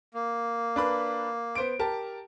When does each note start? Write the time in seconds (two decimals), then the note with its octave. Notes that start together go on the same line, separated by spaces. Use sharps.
0.14 A#3
0.76 D4 B4 B5
1.55 B3 C5 D7
1.79 G4 A#4 A5